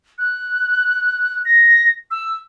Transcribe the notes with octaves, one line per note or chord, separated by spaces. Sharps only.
F#6
A#6
E6